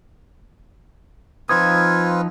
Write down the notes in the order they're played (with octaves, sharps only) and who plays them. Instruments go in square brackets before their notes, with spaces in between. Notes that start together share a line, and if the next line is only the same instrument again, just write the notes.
[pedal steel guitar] F3 D#4 D#6 [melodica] C4 F4 B4 [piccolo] G#6